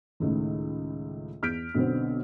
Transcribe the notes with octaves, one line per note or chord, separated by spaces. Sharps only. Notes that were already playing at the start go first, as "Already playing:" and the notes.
C#2 A2 D#3
E2 F6 G6 B6 D7
B1 D3 B3 C4